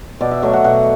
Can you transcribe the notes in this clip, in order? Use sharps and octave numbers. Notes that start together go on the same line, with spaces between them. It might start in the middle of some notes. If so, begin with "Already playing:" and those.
B2 D5
E5
F#3 A3 E5
F#5
B2 F#5